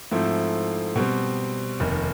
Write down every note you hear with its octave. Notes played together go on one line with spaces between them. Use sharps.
G#2 F3 A3 C4 E4
B2 G3 C4
F1 D#2 D#3